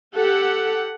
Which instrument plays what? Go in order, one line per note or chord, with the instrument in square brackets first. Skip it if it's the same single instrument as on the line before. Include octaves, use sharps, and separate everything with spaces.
[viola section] G4 A4 F#5